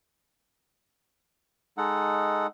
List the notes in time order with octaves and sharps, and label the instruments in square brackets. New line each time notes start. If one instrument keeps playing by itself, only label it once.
[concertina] G#3 D#4 A4 F#5